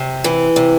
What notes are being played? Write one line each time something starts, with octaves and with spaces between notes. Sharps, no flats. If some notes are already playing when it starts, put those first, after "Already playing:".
Already playing: C3
E3
C3